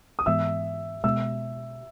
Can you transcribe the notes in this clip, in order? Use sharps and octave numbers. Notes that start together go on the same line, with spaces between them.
D#6
G#2 E3 G#3 B3 E5 E6
B2 G#3 B3 E5 E6